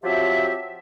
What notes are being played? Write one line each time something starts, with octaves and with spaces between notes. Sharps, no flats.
F3 F#3 C4 G4 E5